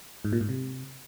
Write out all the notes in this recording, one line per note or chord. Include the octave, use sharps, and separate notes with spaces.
G#2
A#2
G#2
C3